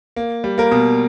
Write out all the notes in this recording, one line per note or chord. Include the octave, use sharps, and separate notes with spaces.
A#3
G3
A#3 A#4
B2